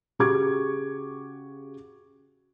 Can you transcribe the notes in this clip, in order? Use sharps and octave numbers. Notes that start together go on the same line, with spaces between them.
C#3 F#4 G4 C#6 D6 G#6